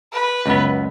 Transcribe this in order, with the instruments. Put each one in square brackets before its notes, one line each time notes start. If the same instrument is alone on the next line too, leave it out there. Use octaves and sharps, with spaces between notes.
[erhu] B4
[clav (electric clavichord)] C#2 F#2 B3